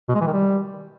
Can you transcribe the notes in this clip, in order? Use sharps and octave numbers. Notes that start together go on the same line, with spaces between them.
B2
G#3
E3
D#3
G3